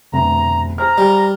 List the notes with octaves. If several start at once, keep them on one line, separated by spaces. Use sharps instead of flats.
F1 D2 B2 A#5
G#4 C5 A#5 F6
G3